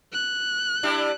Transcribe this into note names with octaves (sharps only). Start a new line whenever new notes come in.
F#6
G3 D4 E4